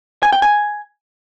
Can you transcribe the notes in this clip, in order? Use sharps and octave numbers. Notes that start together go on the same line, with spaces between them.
G#5
G5
G#5